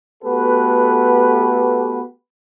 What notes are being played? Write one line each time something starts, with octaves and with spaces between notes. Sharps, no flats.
A3 B3 F#4 G4 A4 B4